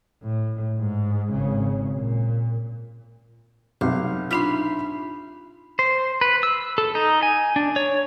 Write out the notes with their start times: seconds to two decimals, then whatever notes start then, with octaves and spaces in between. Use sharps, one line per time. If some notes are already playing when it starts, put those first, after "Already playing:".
0.22 A2
0.79 G#2
1.31 G#1 C#3
1.95 A#2
3.81 B1 C3 F5 D6
4.31 D4 D#4 F4 E5 B5 C6
5.79 C5
6.21 B4
6.43 E6
6.78 A4
6.95 D#4
7.23 G#5
7.56 D4
7.76 C#5